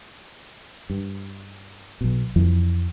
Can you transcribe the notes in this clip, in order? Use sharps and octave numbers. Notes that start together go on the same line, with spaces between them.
G2
B1 B2
F2 E3 F3